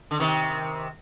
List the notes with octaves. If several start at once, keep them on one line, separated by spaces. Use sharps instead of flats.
D3
C3 D#3